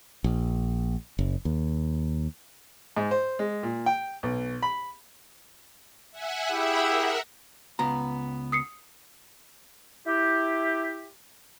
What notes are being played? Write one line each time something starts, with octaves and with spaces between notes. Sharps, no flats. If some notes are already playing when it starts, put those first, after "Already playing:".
A#1
F#1
D#2
G#2
C5
G#3
A#2
G5
B1
B5
E5 F#5 G#5
E4 G4 G#4 E5 F#5 B5
A#4 E5 F#5
C#2 B3 A#5
D#6 C7 C#7
E4 G4